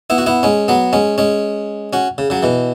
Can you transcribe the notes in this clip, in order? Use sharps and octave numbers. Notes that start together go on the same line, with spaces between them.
B3 E4
F#4
B3 E4
G#3 C#4
F#3 B3
G#3 C#4
G#3 C#4
C#4 F#4
C#3
C#3 F#3
B2 E3